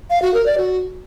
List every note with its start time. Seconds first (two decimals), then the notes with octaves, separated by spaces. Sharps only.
0.10 F5
0.22 F#4
0.34 A#4
0.46 D5
0.58 F#4